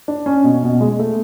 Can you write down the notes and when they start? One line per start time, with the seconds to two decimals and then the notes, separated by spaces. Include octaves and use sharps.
0.08 D4
0.26 C#4
0.44 B2
0.63 B2
0.81 G#3
0.99 A3